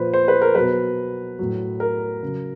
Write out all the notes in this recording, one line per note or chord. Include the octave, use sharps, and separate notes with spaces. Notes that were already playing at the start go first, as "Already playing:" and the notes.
Already playing: A#2 F3 B4 C5
C5
B4
A#4
B2 F#3 B4
A2 F#3
A#4
C#3 F#3